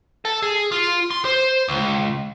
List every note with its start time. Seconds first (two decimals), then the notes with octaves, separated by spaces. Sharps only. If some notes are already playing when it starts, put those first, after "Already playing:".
0.25 A4
0.43 G#4
0.72 F4
1.11 C6
1.25 C5
1.68 C#2